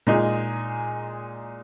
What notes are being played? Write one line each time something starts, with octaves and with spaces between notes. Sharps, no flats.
A#2 G#3 D#4 G#4